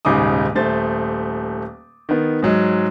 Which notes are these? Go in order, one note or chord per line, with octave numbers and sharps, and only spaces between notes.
D#1 G#2 C#3 D#4 D6 D#6
D#1 A3 C5 A6
D#3 B3
G#2 F#3 G#3